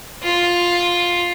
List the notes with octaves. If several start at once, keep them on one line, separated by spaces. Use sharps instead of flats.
F4